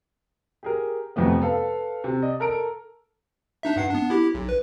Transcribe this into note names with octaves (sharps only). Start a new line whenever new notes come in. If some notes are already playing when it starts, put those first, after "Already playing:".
G4 G#4 A#4
F2 C3 A3 B3
A4 B4 F5
C3
D5 D#5
A4 A#4 A#5 D7
D4 D#4 E5
G2 F#5 C7
B3 D4
E4 G4
B1
B4